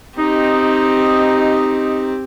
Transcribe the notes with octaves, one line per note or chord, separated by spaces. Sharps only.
C4 D#4 G4